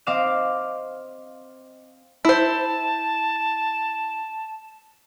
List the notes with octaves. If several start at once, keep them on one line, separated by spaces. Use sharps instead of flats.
C4 D#5 F5 D6 F6 E7
E4 C5 A5